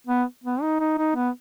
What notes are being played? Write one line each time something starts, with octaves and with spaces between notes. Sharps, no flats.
B3
B3
D#4
D#4
D#4
B3